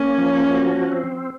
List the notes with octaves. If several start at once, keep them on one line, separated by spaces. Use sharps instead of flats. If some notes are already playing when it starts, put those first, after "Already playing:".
Already playing: A#3 C#4
F3
F#4
C4